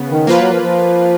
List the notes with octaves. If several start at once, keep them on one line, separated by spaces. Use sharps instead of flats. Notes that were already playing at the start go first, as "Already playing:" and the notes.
Already playing: C#3 B3
D#3
F3 A#3 F4 B4
F#3
F3
F3